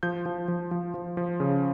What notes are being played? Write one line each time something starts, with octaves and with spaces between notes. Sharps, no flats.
F3 G6
F3
F3
F3
F3
F3
C#3